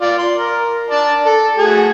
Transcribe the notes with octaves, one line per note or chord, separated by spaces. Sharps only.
F4 D5
C6
A#4
D5 A5
A4
A3 F#4 G#4